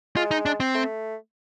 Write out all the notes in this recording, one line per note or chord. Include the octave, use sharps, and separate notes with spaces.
G#3 F4
D#4
D4
C4
A3